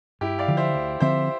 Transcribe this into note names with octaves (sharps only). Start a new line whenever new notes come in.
G2 E4 G4
D5 F5
D3 F3
C5 E5
D2
D3 F3 C4 C5 E5